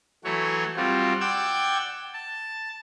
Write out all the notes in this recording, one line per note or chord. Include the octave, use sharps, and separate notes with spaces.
E3 F#3 A3 F#4 C#5
G3 C4 F4 F#4
D5 F#5 G5 E6 G6 G#6
A5